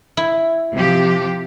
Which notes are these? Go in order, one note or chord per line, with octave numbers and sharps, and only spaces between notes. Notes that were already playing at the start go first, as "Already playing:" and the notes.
E4
C3 F3 G4